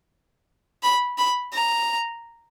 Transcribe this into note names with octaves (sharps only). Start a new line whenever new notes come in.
B5
B5
A#5